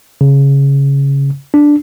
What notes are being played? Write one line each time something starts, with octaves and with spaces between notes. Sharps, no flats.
C#3
D4